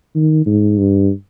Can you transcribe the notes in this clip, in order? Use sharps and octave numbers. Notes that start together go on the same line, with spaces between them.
D#3
G#2
G2